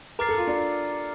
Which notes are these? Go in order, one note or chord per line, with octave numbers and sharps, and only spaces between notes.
A#4 A#5 D6 A6 C7
A4
F4
D4